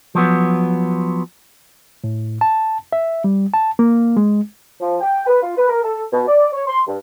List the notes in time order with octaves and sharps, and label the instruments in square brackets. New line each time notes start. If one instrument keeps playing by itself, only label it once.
[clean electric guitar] F3 F#3 B3
[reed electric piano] A2
A5
E5
G3
A5
A#3
G#3
[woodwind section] F3
G5
B4
F4
B4
A#4
A4
B2
D5
C#5
C6
G2